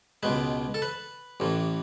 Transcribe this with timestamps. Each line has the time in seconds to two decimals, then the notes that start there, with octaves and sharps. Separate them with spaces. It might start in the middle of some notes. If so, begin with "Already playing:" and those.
0.23 C#2 B2 G#3 B4
0.74 A4
0.82 B4
1.40 A1 A2 E3